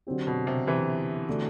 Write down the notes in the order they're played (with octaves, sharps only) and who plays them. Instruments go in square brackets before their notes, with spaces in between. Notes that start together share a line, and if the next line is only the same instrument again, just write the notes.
[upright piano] D3 F#3 C4 G4
[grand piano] B2
C3
C3 E3
[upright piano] D3 A3 D4 F#4